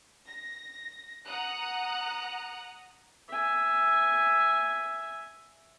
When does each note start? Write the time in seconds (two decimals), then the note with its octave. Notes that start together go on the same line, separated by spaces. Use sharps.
0.29 A#6
1.27 F#5 A#5 D#6 F#6
3.28 E5 G#5